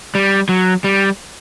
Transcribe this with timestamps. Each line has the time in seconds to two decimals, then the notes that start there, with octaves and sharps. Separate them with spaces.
0.15 G3
0.49 F#3
0.84 G3